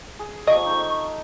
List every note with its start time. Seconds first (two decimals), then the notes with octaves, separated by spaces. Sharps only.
0.19 G#4
0.47 F3 G3 A#3 D#5 C#6
0.66 D#4 A4